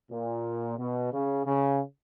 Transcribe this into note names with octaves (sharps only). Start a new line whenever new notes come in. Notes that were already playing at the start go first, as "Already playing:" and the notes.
A#2
B2
C#3
C#3